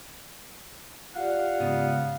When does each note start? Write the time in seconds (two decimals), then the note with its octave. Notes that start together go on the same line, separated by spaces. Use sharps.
1.15 F4 G4 D5 F5 F#5
1.60 G#2 C#3 B3